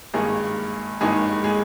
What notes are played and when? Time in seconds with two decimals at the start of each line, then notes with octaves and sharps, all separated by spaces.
0.14 G#1 G2 D#3 G#3 A#3 D#4 G#4
1.01 G#1 G2 D#3 G#3 A#3 D#4 G#4
1.44 G#3 G#4